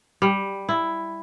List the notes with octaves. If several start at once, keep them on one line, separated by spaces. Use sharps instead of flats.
G3
E4